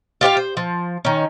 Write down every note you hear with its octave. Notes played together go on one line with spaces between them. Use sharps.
F4 G4 C#5 F5
C5
F3
D#3 C#4